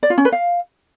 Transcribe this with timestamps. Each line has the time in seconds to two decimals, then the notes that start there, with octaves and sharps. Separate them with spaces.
0.03 D5
0.10 F4
0.18 C#4
0.25 B4
0.32 F5